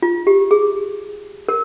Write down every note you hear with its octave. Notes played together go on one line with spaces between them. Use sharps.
F4
G4
G#4
A#4